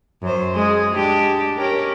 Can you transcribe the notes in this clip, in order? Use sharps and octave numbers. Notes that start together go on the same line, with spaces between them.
F#2 C5
G#3 G#4
G#3 D4 G4
C#4 G4 A#4